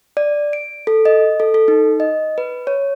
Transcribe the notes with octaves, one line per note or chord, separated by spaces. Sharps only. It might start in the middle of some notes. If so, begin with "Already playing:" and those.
D5
D7
A4
D#5
A4
A4
D#4
D#5
B4
C#5